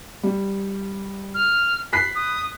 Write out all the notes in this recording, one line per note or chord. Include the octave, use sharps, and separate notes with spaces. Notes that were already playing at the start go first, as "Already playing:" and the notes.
G3
F6
B5 F#6 B6 C7
D#6